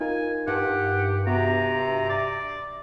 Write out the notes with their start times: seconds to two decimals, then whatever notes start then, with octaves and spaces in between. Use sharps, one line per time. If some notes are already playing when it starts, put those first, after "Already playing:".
0.01 D#4 F4 A#4 G#5
0.47 G2 G4 F#5
1.27 C3 B3 F#4 A#5
2.10 D5 A6